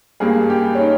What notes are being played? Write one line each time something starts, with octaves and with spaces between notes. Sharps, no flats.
G2 G3 A#3 G#4
G4
C#4
D#4